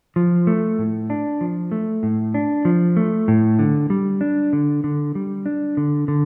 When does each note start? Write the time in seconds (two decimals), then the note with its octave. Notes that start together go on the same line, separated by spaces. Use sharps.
0.16 F3
0.47 A3
0.79 A2
1.10 D4
1.41 F3
1.72 A3
2.03 A2
2.34 D4
2.65 F3
2.97 A3
3.28 A2
3.59 D3
3.90 G3
4.21 D4
4.53 D3
4.84 D3
5.15 G3
5.46 D4
5.77 D3
6.08 D3